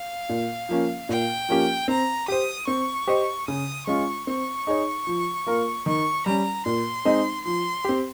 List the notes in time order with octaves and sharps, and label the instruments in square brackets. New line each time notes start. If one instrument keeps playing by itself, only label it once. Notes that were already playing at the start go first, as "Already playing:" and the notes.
Already playing: [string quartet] F5
[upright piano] A#2
F3 A#3 C#4
[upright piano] A#2 [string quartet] G5
[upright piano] F3 A#3 C#4 G4
[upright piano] C4 [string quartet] A#5
[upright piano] G4 C5 [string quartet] D#6
[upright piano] C4 [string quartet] C#6
[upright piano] G4 C5 D#5
[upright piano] C#3 [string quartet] D#6
[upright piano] G#3 C#4 F4 [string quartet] C#6
[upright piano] C4 [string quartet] C#6
[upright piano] D#4 G#4 C#5
F3
A#3 F4 A#4
[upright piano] D#3 [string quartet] C#6
[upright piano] G3 C#4 [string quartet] A#5
[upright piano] A#2 [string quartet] C6
[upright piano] G#3 C4 D#4
[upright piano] F3 [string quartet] C6
[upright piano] C4 G4